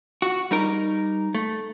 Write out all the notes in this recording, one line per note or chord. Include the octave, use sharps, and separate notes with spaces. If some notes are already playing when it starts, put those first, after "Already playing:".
F#4
G3 D#4 A#4
A3